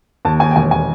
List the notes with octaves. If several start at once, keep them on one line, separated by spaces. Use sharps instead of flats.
D#2 A5
D#2 G#5
G5
E1 G#5
G#5